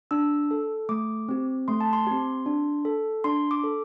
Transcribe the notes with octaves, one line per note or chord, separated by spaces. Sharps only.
D4 E6
A4
A3 D6
C4 G4
A3 C6
A5
C6
C4 G4
D4
A4
D4 C6
D6
A4